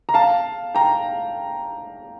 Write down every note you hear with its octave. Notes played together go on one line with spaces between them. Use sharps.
A#5
F5 A5
G5 A#5